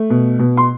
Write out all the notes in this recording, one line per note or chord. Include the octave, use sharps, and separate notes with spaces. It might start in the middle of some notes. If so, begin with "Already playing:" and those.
Already playing: A3
B2
B2
C6